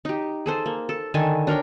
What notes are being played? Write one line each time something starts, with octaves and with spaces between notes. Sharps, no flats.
D#4 G4
G#4 A4 C5
A#3
A4
D3 D#3 A4 G#5
D4 A#4 C#5 G5